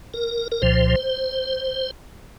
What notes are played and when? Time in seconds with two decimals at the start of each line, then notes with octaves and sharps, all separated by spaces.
0.14 A#4
0.52 A#4
0.62 C2 A#2 F3 C5